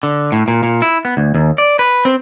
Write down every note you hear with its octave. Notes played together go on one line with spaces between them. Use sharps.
D3
A2
A#2
A#2
E4
B3
D2
D#2
D5
B4
C4